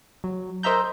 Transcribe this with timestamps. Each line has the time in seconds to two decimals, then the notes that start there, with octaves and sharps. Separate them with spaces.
0.24 F#3
0.63 A#4 C5 D#5 E5 A#5 G6